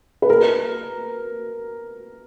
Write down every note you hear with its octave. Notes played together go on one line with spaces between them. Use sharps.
B4
A#4